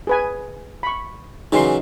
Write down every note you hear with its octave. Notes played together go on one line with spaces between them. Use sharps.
G#4 B4 G#5
B5 C#6
C#3 E3 F#3 D#4 C6